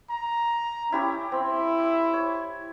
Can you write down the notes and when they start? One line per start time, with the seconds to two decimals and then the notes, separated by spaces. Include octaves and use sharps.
0.10 A#5
0.92 C#4 E4 G4 C#5
1.32 C4 E4
2.13 C#5